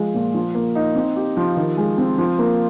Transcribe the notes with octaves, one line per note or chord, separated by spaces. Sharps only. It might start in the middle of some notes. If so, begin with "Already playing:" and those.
Already playing: F3 G#3
A#2
F3
A#3
D#4
C4
G4
F3
D#3
G#3
C4
F3
A#3